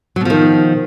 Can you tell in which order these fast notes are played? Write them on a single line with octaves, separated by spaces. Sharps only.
F#3 B2 F3 D#3